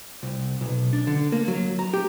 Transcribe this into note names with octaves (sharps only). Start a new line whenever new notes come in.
C2
B1
D4
D3
A#3
F#3
A#5
G4